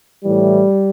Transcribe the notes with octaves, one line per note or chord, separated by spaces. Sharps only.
A2 E3 G3